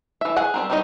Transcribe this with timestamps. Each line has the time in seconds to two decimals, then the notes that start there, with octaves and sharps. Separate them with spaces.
0.21 E3 E5
0.36 G#4 F#5
0.54 G3 C4 A#4
0.70 D#3 F#3 G3 D#4 D#5